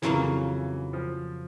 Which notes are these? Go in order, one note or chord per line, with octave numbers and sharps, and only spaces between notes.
F2 C#3 E3 F#3 A#3
F3